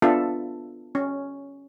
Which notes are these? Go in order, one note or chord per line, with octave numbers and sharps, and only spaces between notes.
B3 D4 F4 A4 E5
C#4